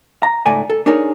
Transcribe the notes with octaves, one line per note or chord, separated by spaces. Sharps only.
A#5
C#2 G#2 A3 D5 G#5
A4
D4 D#4 G#4 A#4 C#5